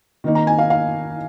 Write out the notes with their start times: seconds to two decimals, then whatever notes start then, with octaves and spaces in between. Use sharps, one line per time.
0.24 D#3 A#3 D#4
0.35 A#5
0.47 G#5
0.59 F5
0.70 F5